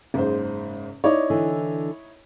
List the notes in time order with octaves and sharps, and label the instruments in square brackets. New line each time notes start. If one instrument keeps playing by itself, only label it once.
[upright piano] F#1 G#2 C5
[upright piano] D#4 E4 C#5 [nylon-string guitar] D5
[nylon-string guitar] D3 E3